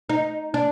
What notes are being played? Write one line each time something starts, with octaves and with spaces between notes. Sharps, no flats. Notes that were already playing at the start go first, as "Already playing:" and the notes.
D#4
D4